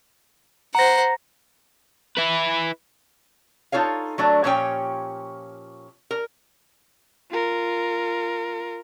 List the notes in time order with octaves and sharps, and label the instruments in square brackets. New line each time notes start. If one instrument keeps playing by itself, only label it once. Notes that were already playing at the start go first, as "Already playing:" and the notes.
[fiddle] C5 F#5 [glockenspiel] A#5 A#6
[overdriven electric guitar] E4 B4
[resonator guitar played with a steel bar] D#4 F4 A4 C#5 F5
F#3 A3 D4
A#2 F3 C#4 G4 C#5 G5
A#4
[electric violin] F4 A#4